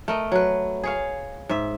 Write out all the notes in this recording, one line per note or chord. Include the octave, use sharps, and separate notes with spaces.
A3 A#4 D#5
F#3 B4
G#4 C#5 F5
G#2 E5